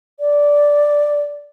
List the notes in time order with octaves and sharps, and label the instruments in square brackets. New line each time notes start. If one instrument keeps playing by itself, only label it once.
[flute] D5